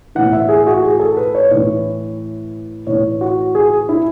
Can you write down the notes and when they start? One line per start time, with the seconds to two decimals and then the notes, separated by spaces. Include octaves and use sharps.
0.15 A2 E3 F#5
0.33 E5
0.49 G#4
0.67 F#4
0.83 G#4
0.99 A4
1.17 B4
1.35 C#5
1.51 A2 E3 C#5
2.87 A2 E3 C#5
3.21 F#4
3.55 G#4
3.89 E4